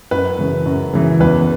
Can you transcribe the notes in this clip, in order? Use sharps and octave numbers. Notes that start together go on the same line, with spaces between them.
F#2 B4
C#3 E3
F#2
C#3 E3
E2 B4